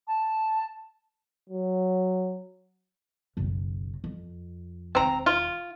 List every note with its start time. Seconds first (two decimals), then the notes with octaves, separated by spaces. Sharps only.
0.08 A5
1.49 F#3
3.37 F#1 B1
4.04 F2
4.95 E1 D#3 C4 A#5
5.26 F4